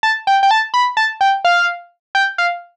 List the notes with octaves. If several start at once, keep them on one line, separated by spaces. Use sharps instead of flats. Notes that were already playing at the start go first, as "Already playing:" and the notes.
A5
G5
G5
A5
B5
A5
G5
F5
G5
F5